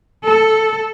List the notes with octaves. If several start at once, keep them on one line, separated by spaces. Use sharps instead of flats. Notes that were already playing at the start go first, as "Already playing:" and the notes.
A4